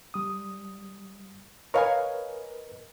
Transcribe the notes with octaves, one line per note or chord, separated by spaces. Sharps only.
G3 D#6
A#4 B4 C#5 D#5 F5 G#5